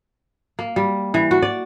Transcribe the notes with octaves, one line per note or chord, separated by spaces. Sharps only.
A#3
G3
E3
F#4
D5